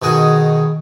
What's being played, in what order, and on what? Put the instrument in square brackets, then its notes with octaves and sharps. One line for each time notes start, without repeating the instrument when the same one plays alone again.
[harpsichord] B2 D#3 F#4 G#4